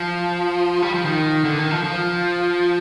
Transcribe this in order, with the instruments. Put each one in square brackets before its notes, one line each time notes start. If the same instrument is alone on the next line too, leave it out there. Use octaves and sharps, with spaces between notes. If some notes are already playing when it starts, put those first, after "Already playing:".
Already playing: [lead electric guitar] F3
G3
F3
D#3
D3
D#3
F3
F3